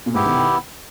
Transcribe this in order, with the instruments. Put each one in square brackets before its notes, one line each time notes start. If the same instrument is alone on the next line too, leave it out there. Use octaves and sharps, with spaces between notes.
[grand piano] A#2
[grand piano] G#2 [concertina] B3 E4 G4
[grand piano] B2 D#3
B2 D#3